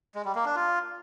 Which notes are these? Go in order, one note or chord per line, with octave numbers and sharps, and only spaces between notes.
G#3
G3
A#3
D4
F4